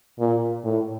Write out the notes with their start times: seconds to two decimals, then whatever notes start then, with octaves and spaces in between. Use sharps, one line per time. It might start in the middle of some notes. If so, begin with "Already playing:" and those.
0.19 A#2
0.64 A2